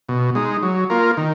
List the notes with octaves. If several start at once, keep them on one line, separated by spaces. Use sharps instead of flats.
B2
G#3 D#4
F#3
A#3 F4 A#4
D#3